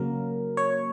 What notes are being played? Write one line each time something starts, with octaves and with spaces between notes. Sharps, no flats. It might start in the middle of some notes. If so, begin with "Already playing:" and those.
Already playing: C#3 F#3 A#3 A#4
C#5